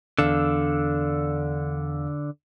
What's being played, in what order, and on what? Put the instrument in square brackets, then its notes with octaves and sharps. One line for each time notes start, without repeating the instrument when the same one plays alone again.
[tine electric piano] E2 F5 E6 [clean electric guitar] D3